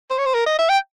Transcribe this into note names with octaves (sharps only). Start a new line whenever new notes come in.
C5
C#5
C5
A#4
D#5
E5
G5